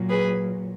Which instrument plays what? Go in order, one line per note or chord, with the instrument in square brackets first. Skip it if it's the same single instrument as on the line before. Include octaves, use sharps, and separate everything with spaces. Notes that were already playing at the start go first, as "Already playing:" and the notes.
Already playing: [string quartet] A#2 F#3
G#4 B4